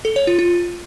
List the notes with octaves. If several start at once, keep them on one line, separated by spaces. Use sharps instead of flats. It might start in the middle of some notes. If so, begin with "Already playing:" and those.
A4
C#5
F4
F4